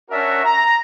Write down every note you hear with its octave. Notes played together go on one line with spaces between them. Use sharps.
C#4 D4 F#4 A#4 E5
A#5